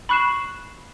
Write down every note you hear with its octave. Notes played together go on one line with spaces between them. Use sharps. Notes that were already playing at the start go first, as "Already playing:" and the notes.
B5 C#6 F#6 C7 E7